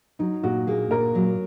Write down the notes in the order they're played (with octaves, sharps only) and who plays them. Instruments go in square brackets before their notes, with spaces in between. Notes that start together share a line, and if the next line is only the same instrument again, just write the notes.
[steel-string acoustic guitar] F#3 [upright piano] D#4
[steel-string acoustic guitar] A#2 [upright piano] F#4
[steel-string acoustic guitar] A#3 [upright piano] G#4
[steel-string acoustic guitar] A#2 [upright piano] A#4
[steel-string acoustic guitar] F#3